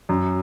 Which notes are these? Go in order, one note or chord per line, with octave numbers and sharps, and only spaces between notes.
F#2